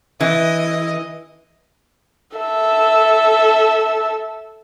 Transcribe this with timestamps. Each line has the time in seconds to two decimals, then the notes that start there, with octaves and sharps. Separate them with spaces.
0.21 E3 D#5
2.37 A4 E5